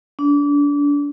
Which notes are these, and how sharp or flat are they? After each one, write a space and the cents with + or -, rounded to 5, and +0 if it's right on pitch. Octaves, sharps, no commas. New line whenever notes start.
D4 -30